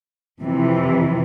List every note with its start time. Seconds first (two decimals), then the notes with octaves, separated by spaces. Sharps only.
0.40 F2 C3 E3